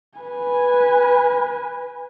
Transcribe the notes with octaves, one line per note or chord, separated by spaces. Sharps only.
B4 G#5